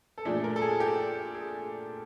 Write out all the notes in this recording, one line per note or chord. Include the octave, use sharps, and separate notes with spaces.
A4
A#2 F3 A3 D4 G#4
A#4
A4
G#4
G4
G#4